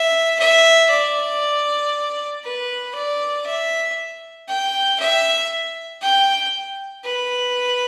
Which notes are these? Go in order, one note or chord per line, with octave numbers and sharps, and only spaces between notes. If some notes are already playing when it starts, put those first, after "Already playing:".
Already playing: E5
E5
D5
B4
D5
E5
G5
E5
G5
B4